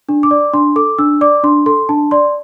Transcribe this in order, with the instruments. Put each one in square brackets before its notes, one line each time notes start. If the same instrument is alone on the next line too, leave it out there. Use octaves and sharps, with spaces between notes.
[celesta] D4
D6
D5
D4 C6
A4 D6
D4 E6
D5 D6
D4 C6
A4 C6
D4 A5
D5 C6